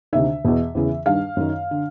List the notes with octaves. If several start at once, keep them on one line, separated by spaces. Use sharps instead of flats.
D2 C3 D#3 E5
E2 B2
E2 C#3 E3
G2 D#3 F5
F#2 D#3
D3